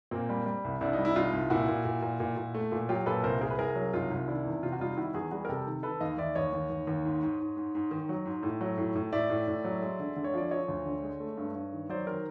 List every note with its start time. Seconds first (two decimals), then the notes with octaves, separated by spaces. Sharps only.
0.11 A#2 A#3 C4
0.29 G3
0.46 G3
0.64 C2
0.81 C2 D4 E4
0.93 G3 D#4
1.05 E4
1.16 C2 D#4 F4
1.33 C2
1.50 A#2 E4 F#4
1.68 A#2
1.85 A#2
2.02 A#2
2.20 A#2
2.37 A#2
2.54 A3
2.72 A#2
2.89 F#3 F4 G4
3.06 A#2 A4 B4
3.24 C2 A#4 C5
3.41 C2 G#4 A#4
3.50 B4
3.59 C2 G#4 A#4
3.75 F#3
3.93 C2 D#4 F4
4.11 C2
4.27 D#3 D4 E4
4.45 E2
4.62 C3 F4
4.72 F#4
4.80 G3 D#4 F4
4.97 D#3 E4 F#4
5.14 E2 F#4 G#4
5.31 G3 F#4 G#4
5.45 A#4
5.48 C3 G4 A4
5.67 D#3
5.83 D#3 A4 B4
6.01 D#2 D#5 F5
6.18 D#2 D5 E5
6.35 D#2 C#5 D#5
6.53 D#2
6.70 D#2
6.87 D#2
7.05 G#2
7.22 G#2
7.40 G#2
7.57 G#2
7.75 G#2
7.91 D#3
8.09 F#3
8.26 G#2
8.43 A2
8.61 F#3
8.78 A2
8.95 A2
9.13 A2 D5 E5
9.30 A2
9.48 A2
9.65 F#3
9.82 G#3
10.00 D3
10.16 D3
10.24 C#5
10.34 F3 D5
10.51 F3 C#5 D#5
10.68 D2
10.85 D3
11.03 G#3
11.20 A3
11.37 G2
11.55 G2
11.73 D#3
11.89 F#3 C5 D5
12.07 D#3 A#4 C5